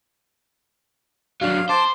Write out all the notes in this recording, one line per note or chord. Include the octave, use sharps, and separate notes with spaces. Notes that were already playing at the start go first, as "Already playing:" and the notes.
F#3 D4 F5
C5 A5 D6